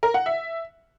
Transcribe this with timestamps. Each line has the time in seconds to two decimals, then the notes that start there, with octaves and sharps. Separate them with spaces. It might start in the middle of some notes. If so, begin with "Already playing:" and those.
0.03 A#4
0.14 F#5
0.26 E5